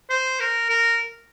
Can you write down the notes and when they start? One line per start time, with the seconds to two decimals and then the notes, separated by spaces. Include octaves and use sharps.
0.10 C5
0.40 A#4
0.70 A#4